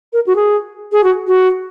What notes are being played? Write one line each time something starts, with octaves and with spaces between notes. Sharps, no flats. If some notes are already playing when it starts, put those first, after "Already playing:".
A#4
F#4
G#4
G#4
F#4
F#4